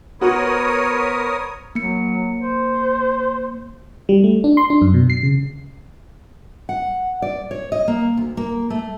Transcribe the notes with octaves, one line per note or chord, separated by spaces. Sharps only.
B3 F#4 A#4 C5 C#5 B5 D#6
F#3 A#3 C#7
C5
G3
A3
D4
C6
D4
F#2
B2
C7
C#3
F#5
D5
C#5
D#5
A#3
D2
A#3
A3